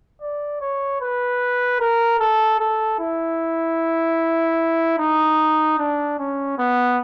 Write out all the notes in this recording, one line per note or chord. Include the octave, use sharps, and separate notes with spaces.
D5
C#5
B4
A#4
A4
A4
E4
D#4
D4
C#4
B3